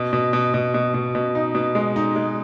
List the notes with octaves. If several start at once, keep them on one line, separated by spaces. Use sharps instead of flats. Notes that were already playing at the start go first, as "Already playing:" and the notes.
Already playing: B2
B2
B2
B2
B2
B2
B2
D#4
B2
G#3
D#4
G#3